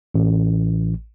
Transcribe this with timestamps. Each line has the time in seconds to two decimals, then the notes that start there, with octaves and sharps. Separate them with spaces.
0.15 A1